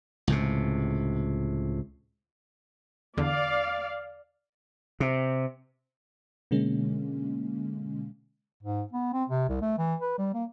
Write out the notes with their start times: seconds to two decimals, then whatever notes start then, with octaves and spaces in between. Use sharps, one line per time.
0.28 C#2 A2 C3
3.17 E2 D3 D5 F5
5.00 C3
6.51 B2 D3 G#3 A#3 C#4
8.63 G#2
8.92 B3
9.13 C4
9.30 C3
9.49 C2
9.61 A3
9.78 E3
10.01 B4
10.18 G3
10.34 A#3